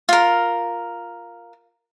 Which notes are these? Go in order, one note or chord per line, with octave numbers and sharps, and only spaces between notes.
F4 A#4